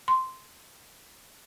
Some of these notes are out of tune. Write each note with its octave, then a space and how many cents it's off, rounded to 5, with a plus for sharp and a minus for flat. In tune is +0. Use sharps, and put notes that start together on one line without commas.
C6 -5